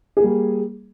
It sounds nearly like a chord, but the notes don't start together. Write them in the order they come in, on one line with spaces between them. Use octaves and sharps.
G#4 A#3 G3